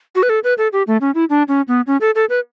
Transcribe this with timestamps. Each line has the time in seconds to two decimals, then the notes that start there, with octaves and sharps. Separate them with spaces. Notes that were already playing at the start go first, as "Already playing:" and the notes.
0.15 F#4
0.23 B4
0.29 A4
0.44 B4
0.58 A4
0.73 G4
0.87 A3
1.01 C#4
1.15 E4
1.30 D4
1.48 C#4
1.68 B3
1.87 C#4
2.01 A4
2.15 A4
2.30 B4